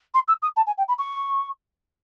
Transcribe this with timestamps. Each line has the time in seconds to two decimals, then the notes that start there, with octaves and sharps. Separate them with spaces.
0.14 C6
0.28 E6
0.42 D#6
0.57 A5
0.67 G#5
0.78 G5
0.88 B5
0.99 C#6